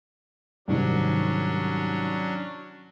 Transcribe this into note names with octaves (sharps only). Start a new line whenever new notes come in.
C2 G#2 D#3 F#3 C#4 D4